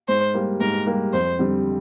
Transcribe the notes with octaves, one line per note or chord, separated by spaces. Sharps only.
G#2 C5
G3 A#3
G#2 A#4
G3 A#3
F2 C5
D3 G3 C4